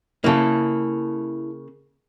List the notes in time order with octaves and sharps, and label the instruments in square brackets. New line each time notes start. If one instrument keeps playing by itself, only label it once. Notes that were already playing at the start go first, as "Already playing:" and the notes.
[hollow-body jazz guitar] C#3 A#3 [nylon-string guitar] E4 A4